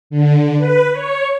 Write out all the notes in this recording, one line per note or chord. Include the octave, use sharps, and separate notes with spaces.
D3
B4
C#5